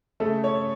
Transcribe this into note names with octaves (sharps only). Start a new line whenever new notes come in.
C#3 A3 A4
C#4 C#5